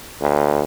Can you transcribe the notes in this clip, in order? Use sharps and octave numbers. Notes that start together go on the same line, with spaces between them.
D2